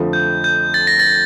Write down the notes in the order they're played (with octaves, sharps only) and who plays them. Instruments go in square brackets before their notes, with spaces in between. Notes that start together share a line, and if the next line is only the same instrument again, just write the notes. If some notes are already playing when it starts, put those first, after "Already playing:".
Already playing: [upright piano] F2 D3 F3 A3
[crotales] G6
G6
A6
A#6
A6